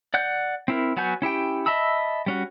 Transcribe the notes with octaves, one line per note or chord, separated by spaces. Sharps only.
D5 F#5 F#6 G6
C4 E4 A#4
F#3 B3 F#4 G#5 G6
C#4 E4 G4 G5
D#5 E5 A5 B5 E6
G3 C#4 F#4